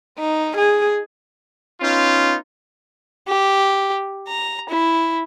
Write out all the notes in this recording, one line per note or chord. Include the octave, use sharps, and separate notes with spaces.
D#4
G#4
B3 C#4 D#4 F4
G4
A#5
E4